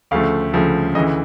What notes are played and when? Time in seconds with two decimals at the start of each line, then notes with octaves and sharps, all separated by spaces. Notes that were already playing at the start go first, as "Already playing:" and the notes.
0.11 D2 C#3 F3 A3 F5
0.53 D2 C#3 F3 A3
0.95 D2 C#3 E3 D#5